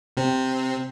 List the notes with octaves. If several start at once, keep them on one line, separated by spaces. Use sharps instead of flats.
C3 C4